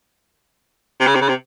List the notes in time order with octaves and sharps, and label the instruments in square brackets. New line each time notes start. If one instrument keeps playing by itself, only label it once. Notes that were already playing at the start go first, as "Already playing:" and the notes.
[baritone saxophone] C3
C#3
C3
C#3
C3